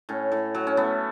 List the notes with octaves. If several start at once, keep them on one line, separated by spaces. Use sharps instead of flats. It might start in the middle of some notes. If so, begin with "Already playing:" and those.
A2 C#4
A2
F#3
C#4
A3 B3